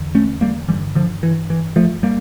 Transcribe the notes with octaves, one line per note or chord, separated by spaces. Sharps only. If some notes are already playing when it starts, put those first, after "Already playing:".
Already playing: E2 D3
A3 C#4
G3 A#3
G2 D3 E3 G3
D3 F3
E3
E3
F3 A3
G3 A#3